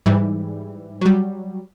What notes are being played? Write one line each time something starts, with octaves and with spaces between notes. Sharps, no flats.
G#2 E3 G3
F#3 G3